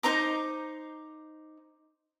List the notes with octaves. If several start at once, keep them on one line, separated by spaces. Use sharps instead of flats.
D#4 C5 A#5 D6